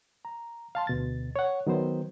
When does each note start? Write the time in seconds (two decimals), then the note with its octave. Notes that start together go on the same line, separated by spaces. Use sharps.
0.25 A#5
0.75 F5 A5 C6
0.87 D2 B2 A6
1.36 C#5 F#5
1.67 D#3 F#3 B3 C5